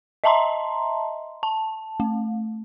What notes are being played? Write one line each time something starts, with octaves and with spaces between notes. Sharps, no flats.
D#5 E5 A5 A#5 C6
A5
A3